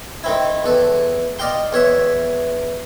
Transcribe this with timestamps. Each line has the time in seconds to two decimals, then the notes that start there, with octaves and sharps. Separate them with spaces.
0.24 D#3 C4 E4
0.64 E2 A4
1.39 D5 D#5 F5 G5 C6
1.73 E2 C#5 E5